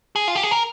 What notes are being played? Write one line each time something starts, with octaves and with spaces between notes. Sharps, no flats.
G#4
F4
G4
G#4
A#4